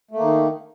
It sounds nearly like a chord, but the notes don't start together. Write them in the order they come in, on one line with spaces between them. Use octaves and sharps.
A3 A#3 D#3